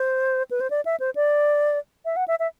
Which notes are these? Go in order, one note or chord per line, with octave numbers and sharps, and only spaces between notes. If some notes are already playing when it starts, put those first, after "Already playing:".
Already playing: C5
B4
C5
D5
E5
C5
D5
E5
F#5
E5
E5